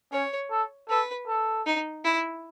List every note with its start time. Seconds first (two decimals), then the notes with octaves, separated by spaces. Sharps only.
0.12 C#4 C#5
0.51 A4
0.89 A4 B4
1.27 A4
1.66 D#4
2.04 E4